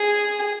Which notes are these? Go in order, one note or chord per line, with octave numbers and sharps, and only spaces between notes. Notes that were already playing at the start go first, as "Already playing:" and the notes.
Already playing: G#4